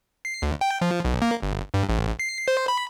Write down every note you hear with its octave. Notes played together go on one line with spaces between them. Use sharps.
C7
D2
G5
F3
B1
A#3
G1
G2
A1
C7
C5
B5